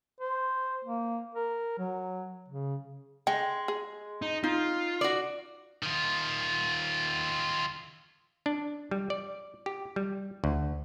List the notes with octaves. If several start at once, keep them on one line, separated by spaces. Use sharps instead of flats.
C5
A#3
A#4
F#3
C#3
G#3 G5
G#4
D#4
D#4 F4
F#4 D5
D#3 F4
D4
G3
D5
G4
G3
D2